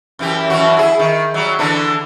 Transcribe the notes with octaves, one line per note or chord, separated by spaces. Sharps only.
F#2 E3 G4
F#2 E3 F#4
E4 G#4
D#3
F#3 G3
D3 E3 D4